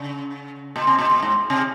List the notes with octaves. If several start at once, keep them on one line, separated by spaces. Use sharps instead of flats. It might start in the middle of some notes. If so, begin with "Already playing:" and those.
Already playing: C#3
A#2
C3
A#2
A#2
G#2
C3